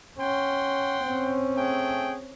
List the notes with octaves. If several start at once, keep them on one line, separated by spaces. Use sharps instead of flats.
C#4 F#5 G5 C6
C4 C#4
A3 G#4 G5